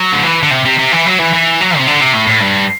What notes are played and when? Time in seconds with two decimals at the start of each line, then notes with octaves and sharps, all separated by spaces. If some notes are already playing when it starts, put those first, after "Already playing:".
Already playing: F#3
0.13 D3
0.24 E3
0.43 D3
0.51 C3
0.65 C3
0.79 C3
0.92 E3
1.06 F#3
1.19 E3
1.33 E3
1.61 F#3
1.78 C3
1.88 D3
2.01 C3
2.15 A2
2.29 A2
2.42 G2